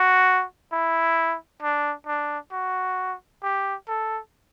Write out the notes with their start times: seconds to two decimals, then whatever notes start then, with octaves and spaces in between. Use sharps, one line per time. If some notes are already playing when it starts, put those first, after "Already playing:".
Already playing: F#4
0.72 E4
1.62 D4
2.07 D4
2.52 F#4
3.43 G4
3.88 A4